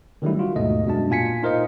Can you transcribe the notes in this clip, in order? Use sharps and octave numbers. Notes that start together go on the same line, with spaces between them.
D3 D#3 F#3 G3 A3 E4
F4 F#4
D#2 G#2 B2 A3 D#5
F#2 B2 G#3 D4 A5
A#2 F4 G#5 B6 C#7
D#4 F4 A#4 C5 D#5